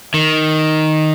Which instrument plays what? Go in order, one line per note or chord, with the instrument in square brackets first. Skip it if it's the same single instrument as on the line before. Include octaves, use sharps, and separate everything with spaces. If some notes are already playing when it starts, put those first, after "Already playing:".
[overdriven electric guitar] D#3